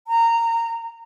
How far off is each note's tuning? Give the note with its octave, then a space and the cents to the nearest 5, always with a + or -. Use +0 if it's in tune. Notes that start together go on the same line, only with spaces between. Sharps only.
A#5 -15